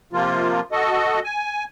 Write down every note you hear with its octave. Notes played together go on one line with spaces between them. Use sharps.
C3 F3 A#3 F4
F#4 A4 D#5
G#5